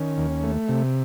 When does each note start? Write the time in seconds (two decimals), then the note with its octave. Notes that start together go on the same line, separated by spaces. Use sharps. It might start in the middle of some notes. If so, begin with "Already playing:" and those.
Already playing: D#3 C#4
0.18 D#2
0.43 A3
0.68 C3